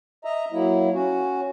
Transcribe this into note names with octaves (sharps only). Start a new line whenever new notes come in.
D#5 E5 A#5
F#3 A#3 E4
C#4 F#4